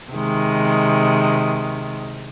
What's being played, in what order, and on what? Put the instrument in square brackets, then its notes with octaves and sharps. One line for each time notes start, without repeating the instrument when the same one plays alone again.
[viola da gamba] C3 D#3 G#3